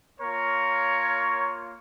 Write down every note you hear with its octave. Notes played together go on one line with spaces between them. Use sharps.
A#3 F4 A#4 C#5